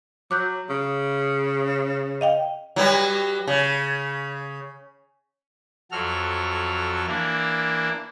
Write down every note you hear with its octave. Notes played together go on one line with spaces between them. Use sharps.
F#3 D6 F#6 G6
C#3
D#5 F5 G5
F#3 G3 B4
C#3
F2 F#3 F#4 A4 F6
E3 A#3 D4 E4